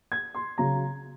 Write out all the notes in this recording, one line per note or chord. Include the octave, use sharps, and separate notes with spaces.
G#6
C6
C#3 F#3 A#5